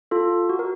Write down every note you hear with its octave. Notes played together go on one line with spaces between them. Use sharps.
F4 A4
F#4
A#4